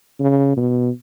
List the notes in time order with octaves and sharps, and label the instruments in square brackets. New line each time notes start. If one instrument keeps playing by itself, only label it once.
[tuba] C#3
B2